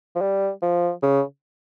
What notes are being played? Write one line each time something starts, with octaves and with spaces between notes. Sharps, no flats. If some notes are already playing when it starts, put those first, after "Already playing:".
F3
G3
F3
C#3